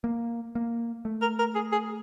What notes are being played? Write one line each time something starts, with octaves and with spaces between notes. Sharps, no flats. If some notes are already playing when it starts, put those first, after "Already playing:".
A#3
A#3
A3
A#4
A#4
G#4
G#4